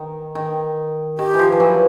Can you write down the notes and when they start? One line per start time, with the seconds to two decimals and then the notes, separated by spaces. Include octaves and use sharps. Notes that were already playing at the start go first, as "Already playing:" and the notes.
Already playing: D#3
0.35 D#3
1.18 D#3 G4
1.34 E3
1.39 F3
1.52 F3
1.60 E3 F#3